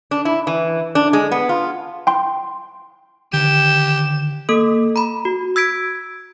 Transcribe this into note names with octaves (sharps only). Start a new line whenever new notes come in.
D4
E4
E3
D4
G#3
B3
F4
G5 C6
D3 D#3 G4 E7
A#3 A4 D#6
A#5 B5
F#4
E6 G#6 B6 D7